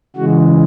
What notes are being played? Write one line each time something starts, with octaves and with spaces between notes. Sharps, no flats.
C#3 E3 G#3 F#4